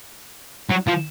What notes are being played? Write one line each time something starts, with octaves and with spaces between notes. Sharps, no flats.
F#3
F3